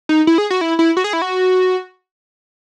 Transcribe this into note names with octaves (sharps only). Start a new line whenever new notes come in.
D#4
E4
G#4
F#4
E4
E4
F#4
G#4
E4
F#4